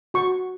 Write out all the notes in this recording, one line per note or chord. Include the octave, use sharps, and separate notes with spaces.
F#4 C#6